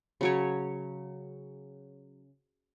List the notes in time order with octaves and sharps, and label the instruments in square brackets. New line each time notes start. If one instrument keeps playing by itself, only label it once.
[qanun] C#3 F#3 C#5